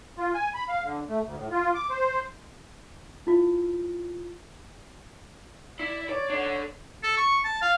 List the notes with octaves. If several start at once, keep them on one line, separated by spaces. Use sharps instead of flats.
F4
G#5
B5
F5
D3
A3
D2
A2
F4
D6
C5
E4 F4
E4 D5
C#5 D5
D4 A4
A4
C#6
A5
F5